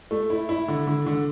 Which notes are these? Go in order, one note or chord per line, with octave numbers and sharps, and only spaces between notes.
A3
E4
E4
D3
D3
D3